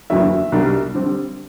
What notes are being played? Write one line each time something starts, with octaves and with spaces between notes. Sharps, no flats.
F#1 E2 D3 F#3 E5
C2 B2 G3 D4
D3 G3 C4